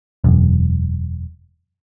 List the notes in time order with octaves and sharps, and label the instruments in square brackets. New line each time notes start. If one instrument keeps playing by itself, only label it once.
[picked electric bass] E1 F#2